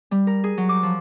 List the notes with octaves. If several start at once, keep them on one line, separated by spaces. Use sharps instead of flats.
G3
A#4
G#4
F#3
D6
F3